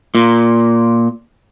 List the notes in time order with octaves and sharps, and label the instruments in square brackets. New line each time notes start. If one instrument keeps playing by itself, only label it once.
[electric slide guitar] A#2